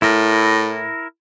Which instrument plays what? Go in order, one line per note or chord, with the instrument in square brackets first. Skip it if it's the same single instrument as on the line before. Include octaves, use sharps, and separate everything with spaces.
[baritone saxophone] A2 [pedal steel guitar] E4 A#4